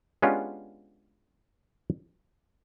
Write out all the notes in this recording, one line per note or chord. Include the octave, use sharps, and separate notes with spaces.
G#3 B3 C#4 D4 F4 G4